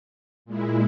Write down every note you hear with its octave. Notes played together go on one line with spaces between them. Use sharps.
A#2 G#3 E4